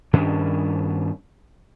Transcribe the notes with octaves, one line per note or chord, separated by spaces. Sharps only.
G2 D#3 C#4 D4